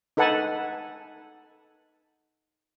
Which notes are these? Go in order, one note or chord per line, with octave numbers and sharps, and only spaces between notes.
D#4 A4 B4 F#5 G#5 A5